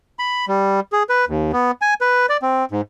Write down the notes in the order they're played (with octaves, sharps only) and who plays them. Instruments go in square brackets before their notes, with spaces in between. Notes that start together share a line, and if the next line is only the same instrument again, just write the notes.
[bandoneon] B5
G3
G#4
B4
D#2
B3
G#5
B4
D5
C4
G#2